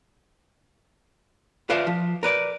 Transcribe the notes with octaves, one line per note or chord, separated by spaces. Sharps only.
F4 B4 C5 D5 E5 F5
F3
A#4 B4 D5